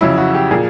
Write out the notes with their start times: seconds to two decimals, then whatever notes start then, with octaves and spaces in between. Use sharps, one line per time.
0.01 F2 C#3 F#3 E4
0.18 F#4
0.35 G4
0.51 A#2 F3 G#4